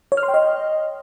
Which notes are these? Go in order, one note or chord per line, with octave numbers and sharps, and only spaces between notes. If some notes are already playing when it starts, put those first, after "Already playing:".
C#5
F6
C6
G5
D#5